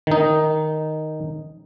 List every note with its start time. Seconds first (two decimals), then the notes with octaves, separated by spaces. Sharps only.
0.07 D#3 D#4